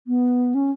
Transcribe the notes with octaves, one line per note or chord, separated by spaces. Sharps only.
B3
C#4